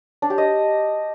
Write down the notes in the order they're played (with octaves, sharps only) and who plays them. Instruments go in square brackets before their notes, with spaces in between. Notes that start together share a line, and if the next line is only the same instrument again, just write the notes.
[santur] D4
G4
D#5